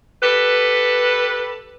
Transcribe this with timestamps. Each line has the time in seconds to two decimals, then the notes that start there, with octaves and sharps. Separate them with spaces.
0.23 G4 A4 B4